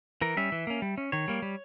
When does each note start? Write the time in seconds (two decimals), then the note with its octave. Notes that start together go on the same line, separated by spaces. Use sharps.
0.21 E3 A#4
0.37 G3 C#4 E5
0.52 E3
0.67 A#3 C#4
0.82 G3
0.98 C#4
1.12 D#3 C#5
1.28 G3 A#3
1.42 G3